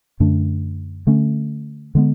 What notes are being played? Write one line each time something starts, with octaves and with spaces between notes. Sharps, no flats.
F#2 D3 A3 D4
D3 A3 C#4
D3 G#3 B3